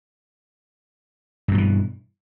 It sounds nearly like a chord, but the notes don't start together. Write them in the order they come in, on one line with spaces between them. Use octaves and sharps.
G2 B2 F3 E3